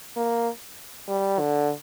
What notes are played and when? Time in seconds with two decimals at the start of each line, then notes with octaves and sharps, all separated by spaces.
0.16 A#3
1.09 G3
1.39 D3